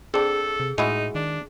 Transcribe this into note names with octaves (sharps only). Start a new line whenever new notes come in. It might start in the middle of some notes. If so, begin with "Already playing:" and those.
C4 D4 G#4 A4
C3
A2 G#3 D#4 E4 F#4
D#3 D4